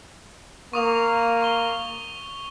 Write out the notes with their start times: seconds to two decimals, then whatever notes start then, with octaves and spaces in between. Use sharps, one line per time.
0.73 A#3 C#6 D#6 F7
1.42 C#6 G7